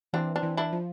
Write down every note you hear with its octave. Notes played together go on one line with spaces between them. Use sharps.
E3 C4 D4
C4 D4
E3
D4 E4
F3